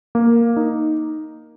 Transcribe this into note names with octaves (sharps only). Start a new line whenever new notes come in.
A#3
D#4